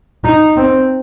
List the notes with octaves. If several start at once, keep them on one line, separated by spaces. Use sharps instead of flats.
D#4
C4